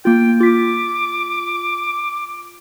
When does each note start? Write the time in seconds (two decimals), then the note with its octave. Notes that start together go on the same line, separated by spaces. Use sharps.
0.05 A#3 F4 G5
0.40 F4 D6 B6